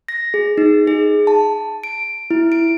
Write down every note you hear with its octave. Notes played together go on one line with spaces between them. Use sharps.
A#6
G#4
D#4
G#4
A5
D7
E4
D7